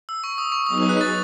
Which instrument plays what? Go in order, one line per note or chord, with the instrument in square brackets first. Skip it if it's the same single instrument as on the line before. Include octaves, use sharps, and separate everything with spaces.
[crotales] E6
C#6
D#6
C#6
[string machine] F#3 B3 D#4 G#4 B4 [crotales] D#6
[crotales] D#6
F#6
A6